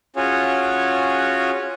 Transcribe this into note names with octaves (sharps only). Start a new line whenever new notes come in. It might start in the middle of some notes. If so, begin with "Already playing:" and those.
C#4 F4 F#4 G#4 C#5